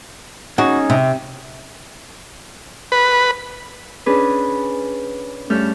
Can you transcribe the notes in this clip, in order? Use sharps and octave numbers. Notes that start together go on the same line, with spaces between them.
C#4 D#4 F#4 G#4
C3
B4
C#4 D4 G#4 B4
G2 A3 C#4 A4 F6 G6